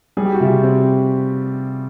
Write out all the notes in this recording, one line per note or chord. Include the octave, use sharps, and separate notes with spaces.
G3 G#4
G4
F#4
C3 F4 G4
C4